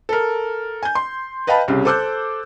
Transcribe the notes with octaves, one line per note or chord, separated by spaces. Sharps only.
A4 A#4
G#5 G6
C6
B4 D#5 F5 G5 A5 B5
C2 C#3 G3
A4 C5 D6 E6 F#6 G6